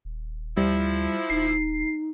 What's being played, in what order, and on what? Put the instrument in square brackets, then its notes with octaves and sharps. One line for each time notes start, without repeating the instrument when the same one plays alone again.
[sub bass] D#1
[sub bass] D2 [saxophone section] F3 E4 [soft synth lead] G3
[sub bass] D#1 [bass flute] D#4 [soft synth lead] C7